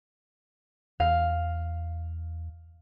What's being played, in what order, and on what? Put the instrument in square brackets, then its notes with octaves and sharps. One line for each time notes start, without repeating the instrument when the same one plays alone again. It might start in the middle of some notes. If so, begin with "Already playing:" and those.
[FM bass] E2 [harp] F5